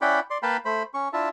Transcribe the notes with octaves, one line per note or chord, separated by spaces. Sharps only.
C#4 E4 D5 F#5 G5 B5
D5 C6
A#3 B4 F5 G5 A5 B5
A3 C5 B5
C#4 C#6
D4 E4 F4 E5 A5